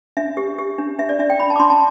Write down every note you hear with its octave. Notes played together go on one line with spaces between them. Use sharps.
D4 E5
G4
G4
D4
D4 E5
D5
D4 E5
G5
D4 B5
A5
D6
D4 C6
A5